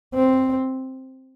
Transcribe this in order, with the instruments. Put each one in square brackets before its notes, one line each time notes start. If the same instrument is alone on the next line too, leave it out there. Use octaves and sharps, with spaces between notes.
[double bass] C4